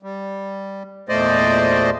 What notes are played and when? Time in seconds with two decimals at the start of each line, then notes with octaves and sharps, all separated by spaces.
0.03 G3
1.09 E2 A#2 A3 C5 D5 D#5